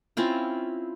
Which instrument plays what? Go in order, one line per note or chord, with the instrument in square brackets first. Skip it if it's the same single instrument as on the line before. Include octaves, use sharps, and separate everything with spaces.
[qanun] C4 C#4 E4 F4